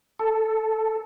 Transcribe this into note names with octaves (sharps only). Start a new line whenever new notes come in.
A4